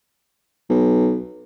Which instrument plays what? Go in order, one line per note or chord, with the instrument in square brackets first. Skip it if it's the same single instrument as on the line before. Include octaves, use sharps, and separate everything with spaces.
[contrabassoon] B1